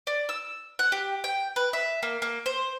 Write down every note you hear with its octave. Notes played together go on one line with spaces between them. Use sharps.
D5
E6
F#5
G4
G5
B4
E5
A#3
A#3
C5